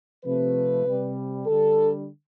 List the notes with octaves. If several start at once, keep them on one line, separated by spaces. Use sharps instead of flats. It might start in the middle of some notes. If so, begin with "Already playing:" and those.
C3 F3 A3 B4
C3 G3
D3 G3 A4